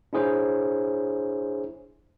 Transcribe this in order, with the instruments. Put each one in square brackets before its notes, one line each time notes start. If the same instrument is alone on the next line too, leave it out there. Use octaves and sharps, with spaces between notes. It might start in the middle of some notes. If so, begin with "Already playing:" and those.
[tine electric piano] D4 E4 G#4 C5 C#5